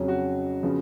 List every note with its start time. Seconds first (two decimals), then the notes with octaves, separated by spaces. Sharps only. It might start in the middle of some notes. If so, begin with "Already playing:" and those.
Already playing: F2 C#3 F#3 C#4
0.08 F#4
0.63 C#3 F3 B3